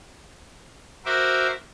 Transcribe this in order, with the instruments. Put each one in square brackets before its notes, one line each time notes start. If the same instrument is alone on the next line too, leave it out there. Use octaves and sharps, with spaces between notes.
[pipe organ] F#4 A#4 C5 E5 D6